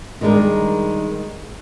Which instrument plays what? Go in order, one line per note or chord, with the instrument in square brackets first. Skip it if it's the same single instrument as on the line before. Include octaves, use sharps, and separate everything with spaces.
[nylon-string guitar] D#3 G3 G#3 D4 A#4